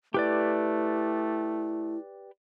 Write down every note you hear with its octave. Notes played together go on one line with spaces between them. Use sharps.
A3 E4 G4 B4 D5